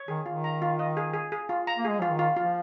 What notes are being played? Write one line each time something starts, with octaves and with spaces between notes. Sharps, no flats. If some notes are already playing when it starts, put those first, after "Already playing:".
Already playing: C#5
D#3 G#4
D#3 F4
A#5
F4
D#5
G#4
G#4
G#4
F4
A#5
A#3
G#3 G#4
F3 F4
D#3
F4
F3 F4